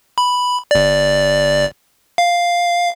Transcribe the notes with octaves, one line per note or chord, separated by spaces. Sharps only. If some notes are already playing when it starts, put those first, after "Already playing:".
B5
G1 D5
F5